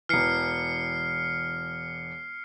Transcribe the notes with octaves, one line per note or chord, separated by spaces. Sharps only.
E1 E3 F6 C7 C#7